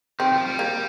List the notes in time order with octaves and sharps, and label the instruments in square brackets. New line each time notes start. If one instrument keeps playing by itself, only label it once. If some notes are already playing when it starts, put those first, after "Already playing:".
[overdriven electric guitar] D#3 [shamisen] C4
[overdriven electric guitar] F3
G3
[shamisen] A#3